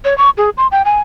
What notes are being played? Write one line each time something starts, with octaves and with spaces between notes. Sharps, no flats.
C#5
C#6
G#4
C6
G5
G#5